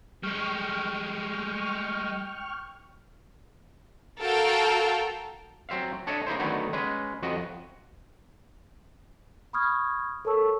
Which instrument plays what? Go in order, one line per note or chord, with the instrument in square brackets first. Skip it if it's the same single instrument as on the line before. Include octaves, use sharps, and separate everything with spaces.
[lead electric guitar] G3 G#3 [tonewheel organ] G5 C#6 F6
[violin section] F#4 A4 A#4 F5 G5
[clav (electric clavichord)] F#3 C4 E5 F5
D4 A4 C#5 D#5 E5
A#3 D#4 E4 C5
D3 D#3 F#3 A3 B3 D#4
G#3 C#4 B4
F2 F#4 D#5
[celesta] B5 C#6 D#6 F6 G#6
A4 A#4 C#5 A5 C#6 E6